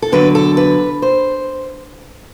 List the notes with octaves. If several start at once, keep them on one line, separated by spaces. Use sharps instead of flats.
A4
E2 D3 F#3 B4
A4
B4
C5